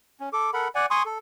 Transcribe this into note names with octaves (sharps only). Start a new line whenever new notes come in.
C#4
A4 D6
A4 A#4 F#5 B5
D5 F#5 G#5
G#5 C6 C#6 D#6
A4